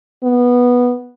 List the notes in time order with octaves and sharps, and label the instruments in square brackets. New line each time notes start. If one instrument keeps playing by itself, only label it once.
[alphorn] B3